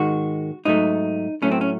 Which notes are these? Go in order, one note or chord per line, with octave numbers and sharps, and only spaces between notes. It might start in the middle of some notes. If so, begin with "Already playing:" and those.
Already playing: G#2 D#3 G#3 F#4
G#2 F#3 A3 D#4
A2 F#3 A3 C#4
C4
C#4